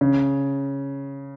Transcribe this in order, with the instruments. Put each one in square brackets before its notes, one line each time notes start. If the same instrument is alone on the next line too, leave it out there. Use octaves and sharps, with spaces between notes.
[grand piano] C#3